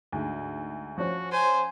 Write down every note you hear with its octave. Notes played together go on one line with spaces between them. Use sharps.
D2 G#2
F3 C#4 F#4
C5 G#5